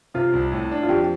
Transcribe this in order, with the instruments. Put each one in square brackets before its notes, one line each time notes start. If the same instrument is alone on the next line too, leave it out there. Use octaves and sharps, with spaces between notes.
[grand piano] C3 [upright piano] F4
[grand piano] C2
A2
D4
[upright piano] F4
[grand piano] F2 [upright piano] G4